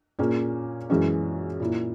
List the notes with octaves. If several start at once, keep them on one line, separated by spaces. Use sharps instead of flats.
A#2 A#3 C#4 G#4
F#2 E3 G#3 C#4
A#2 A#3 E4